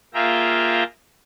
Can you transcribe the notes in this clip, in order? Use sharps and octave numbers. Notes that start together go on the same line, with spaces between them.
A#3 F4 G#4 E5 G5 A#5